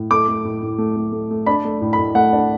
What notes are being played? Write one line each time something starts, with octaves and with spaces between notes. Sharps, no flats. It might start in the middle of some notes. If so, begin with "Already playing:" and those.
Already playing: A2
A3 D6
A3
A2
A2
A3
A3
A3
A3
D4 B5
A3
A2
B5
A2
A3 F#5
D4